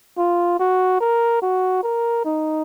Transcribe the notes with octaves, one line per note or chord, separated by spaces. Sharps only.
F4
F#4
A#4
F#4
A#4
D#4